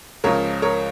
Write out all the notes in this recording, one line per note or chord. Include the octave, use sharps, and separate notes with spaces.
C#2 C#3 F3 A#4 C#5
A#4 C#5